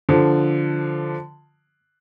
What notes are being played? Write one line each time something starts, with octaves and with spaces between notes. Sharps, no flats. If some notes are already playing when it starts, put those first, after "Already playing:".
D3 F3